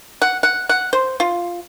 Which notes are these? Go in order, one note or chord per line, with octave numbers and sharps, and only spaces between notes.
F#5
F#5
F#5
C5
F4